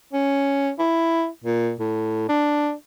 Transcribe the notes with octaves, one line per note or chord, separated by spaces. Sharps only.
C#4
E4
A#2
A2
D4